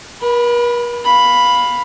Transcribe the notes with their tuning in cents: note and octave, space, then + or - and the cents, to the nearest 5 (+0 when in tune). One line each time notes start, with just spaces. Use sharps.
A#4 +45 B5 +0
F5 +15 B5 +0